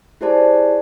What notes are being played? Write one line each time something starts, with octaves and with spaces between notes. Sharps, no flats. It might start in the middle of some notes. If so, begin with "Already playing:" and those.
E4 G4 G#4 C5 D5 A5